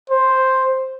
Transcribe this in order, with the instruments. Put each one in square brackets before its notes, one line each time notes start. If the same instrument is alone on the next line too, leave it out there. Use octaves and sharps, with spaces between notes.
[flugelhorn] C5